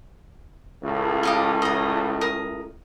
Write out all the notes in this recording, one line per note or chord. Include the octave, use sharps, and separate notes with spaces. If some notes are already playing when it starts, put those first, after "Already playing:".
C#2 A2
G4 D#5 F5
D#5 A#5
A#4 D#6